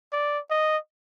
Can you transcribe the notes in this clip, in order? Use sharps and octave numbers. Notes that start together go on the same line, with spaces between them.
D5
D#5